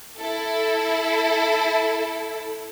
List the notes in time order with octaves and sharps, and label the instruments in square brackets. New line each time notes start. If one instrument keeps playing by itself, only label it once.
[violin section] E4 A4